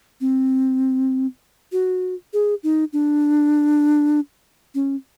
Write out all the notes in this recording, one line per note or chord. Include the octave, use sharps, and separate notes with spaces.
C4
F#4
G#4
D#4
D4
C#4